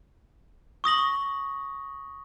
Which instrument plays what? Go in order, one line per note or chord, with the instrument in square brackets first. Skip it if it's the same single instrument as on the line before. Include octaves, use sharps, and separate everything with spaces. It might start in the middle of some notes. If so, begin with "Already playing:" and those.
[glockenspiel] C#6 D#6 A#6 F#7